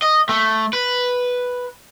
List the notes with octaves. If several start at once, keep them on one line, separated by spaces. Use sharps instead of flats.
D#5
A3
B4